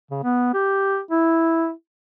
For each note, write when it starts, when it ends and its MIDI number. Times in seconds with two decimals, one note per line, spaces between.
0.11 0.20 49
0.24 0.51 59
0.54 1.00 67
1.11 1.71 64